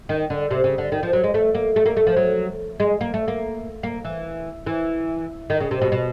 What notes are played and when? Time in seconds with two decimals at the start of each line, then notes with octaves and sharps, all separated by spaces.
0.09 D#3
0.30 D3
0.51 C3
0.64 C#3
0.78 D3
0.92 D#3
1.03 F3
1.13 F#3
1.24 G#3
1.34 A3
1.55 A#3
1.76 A3
1.86 A#3
1.97 A3
2.07 F3
2.17 F#3
2.80 G#3
3.01 A#3
3.14 A3
3.28 A#3
3.83 A#3
4.05 E3
4.67 E3
5.50 D#3
5.60 C#3
5.71 C3
5.81 B2
5.92 B2